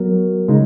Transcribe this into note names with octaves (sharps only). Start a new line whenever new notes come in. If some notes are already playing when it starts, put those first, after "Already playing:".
Already playing: F#3 B3 F#4 A#4
C#3 G#3 D#4